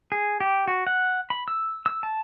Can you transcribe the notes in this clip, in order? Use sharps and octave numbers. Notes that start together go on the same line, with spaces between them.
G#4
G4
F#4
F#5
B5
E6
E6
A5